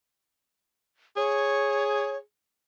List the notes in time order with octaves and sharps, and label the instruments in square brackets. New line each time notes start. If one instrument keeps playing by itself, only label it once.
[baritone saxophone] G#4 [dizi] C#5